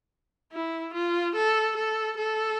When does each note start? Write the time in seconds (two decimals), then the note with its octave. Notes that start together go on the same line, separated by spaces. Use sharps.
0.53 E4
0.94 F4
1.35 A4
1.77 A4
2.18 A4